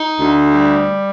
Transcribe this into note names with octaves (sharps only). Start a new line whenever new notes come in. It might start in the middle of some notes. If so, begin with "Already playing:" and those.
Already playing: D#4
D2
G3